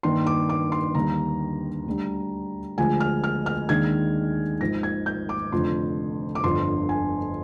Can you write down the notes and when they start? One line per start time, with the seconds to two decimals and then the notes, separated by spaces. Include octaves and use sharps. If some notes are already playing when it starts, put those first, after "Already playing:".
0.03 G2 D#3 A#3 D4 C6
0.26 D6
0.49 D6
0.72 C6
0.94 D#2 D3 G3 D4 A#5
1.86 D2 D3 G3
2.78 D2 D3 F3 G#3 G#5
3.00 F6
3.24 F6
3.46 F6
3.69 D#2 D#3 G#3 D4 G#6
4.61 G#1 G#2 F3 A#6
4.83 G#6
5.06 G6
5.29 D6
5.52 F1 F2 D3 C6
6.35 D6
6.43 G1 F2 D3 C6
6.89 G#5